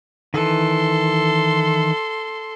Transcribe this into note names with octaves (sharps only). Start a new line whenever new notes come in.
D#3 E3 A4 C6